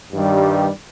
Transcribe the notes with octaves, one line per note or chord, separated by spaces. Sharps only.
G2 D#3 G3